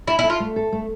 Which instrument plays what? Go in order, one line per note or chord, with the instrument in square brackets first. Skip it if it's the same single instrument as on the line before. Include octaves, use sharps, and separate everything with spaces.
[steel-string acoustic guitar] D4 [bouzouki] E4
[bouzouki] E4
[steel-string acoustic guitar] A4
[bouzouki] F4
[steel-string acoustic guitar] A3
A4
A3